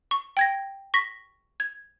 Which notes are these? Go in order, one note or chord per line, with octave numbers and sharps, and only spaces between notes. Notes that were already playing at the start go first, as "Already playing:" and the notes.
C#6
G5 G#6 A#6
C#6 A#6 B6
G#6